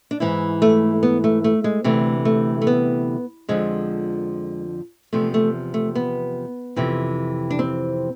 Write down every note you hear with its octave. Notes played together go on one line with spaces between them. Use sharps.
D4
G#2 E3 E4
A3
B3
A3
A3
G#3
D2 C3 E3 A3
A3
A3
B3
F2 D3 F3 G#3
E2 C3 F3 A3
A3
A3
B3
F2 C3 E3
D4
C4